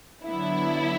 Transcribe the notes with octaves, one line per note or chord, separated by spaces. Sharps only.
D3 F#3 B3 D4 E4